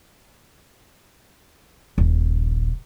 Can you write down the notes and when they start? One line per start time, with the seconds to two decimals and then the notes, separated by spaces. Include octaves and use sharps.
1.98 D#1 A#1